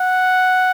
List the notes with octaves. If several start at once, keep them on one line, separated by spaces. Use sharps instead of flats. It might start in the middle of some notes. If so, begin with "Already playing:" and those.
Already playing: F#5